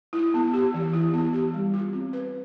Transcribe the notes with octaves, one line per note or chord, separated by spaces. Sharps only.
E4
B3
G4
E3
E4
B3
G4
G3
F4
C4
B4